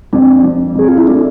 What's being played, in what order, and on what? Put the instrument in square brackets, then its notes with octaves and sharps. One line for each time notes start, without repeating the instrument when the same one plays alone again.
[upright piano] F2 [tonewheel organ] D4
[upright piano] F2
[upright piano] F2 [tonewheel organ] G#4
[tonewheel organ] F4
E4
[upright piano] A3 [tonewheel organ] D4